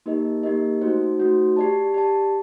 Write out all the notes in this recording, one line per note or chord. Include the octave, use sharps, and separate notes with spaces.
A#3 D#4 G4 A#4 D#5
A#3 D#4 G4 A#4 D#5
A3 D#4 F#4 C5
A3 D#4 F#4 C5
G4 D5 A5
G4 D5 A5